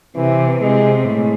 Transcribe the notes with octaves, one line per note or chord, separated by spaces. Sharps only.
C3 E3
C3 G#3
A2 G#3